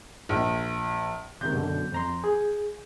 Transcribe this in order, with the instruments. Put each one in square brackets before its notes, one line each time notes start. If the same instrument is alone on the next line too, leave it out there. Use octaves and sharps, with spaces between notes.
[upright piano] A#1
[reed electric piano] C#2 C3 D#3 [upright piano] G6
[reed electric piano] F#2 B2 D3
F2 A#5 C6
G#4